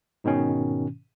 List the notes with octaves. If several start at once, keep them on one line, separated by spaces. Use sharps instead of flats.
G#2 B2 D#3 C#4